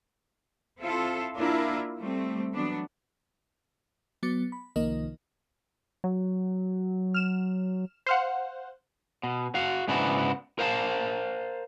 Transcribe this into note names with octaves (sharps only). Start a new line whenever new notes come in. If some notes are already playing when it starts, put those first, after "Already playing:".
C4 E4 F4 A4
A#3 D4 E4 F4 A#4
G3 A3 C4
E3 F#3 B3 D4
F#3 B3 D6 A6 C#7
B5
C2 D#3 F3 A#3 A#4 D#5
F#3
F6 E7
C5 F5 F#5
B2
F#4 F5
G#2 C#3 B3 D4 E4 F#4
A#4 C5 F5 G5 A5